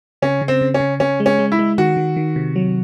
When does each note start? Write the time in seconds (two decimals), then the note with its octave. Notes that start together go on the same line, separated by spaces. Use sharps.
0.22 C#3 C#4
0.41 C#3
0.48 C4
0.61 C#3
0.74 C#4
0.80 C#3
1.00 C#3 C#4
1.20 G#3
1.26 C#4
1.39 G#3
1.52 E4
1.59 G#3
1.78 D#3 F#4
1.97 D#3
2.16 D#3
2.36 C3
2.56 F#3